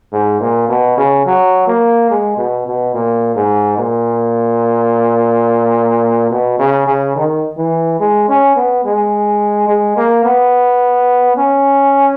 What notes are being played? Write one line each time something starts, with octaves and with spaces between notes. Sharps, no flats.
G#2
A#2
B2
C#3
F#3
A#3
G#3
B2
B2
A#2
G#2
A#2
B2
C#3
C#3
D#3
E3
G#3
C#4
B3
G#3
G#3
A#3
B3
C#4